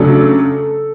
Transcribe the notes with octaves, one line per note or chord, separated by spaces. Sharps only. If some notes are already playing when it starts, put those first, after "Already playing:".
Already playing: C#3 F#3 A3 D4 A4